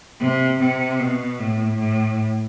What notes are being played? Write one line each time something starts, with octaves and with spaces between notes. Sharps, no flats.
C3
C3
B2
A2
A2